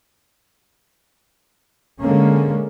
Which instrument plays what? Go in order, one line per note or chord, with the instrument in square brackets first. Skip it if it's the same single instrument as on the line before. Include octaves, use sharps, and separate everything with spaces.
[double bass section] D3 G#3 A#3 C#4